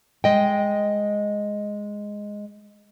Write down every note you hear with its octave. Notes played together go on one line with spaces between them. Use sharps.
G#3 D#5 G5